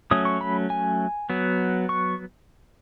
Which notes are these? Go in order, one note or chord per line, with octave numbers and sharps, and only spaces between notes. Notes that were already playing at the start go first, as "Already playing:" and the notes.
F#3 A3 C#4 D#6
C#6
B5
G#5
F#3 B3
C#6